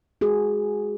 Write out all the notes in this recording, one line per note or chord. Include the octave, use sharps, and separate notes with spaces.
G#3 F#4 G#4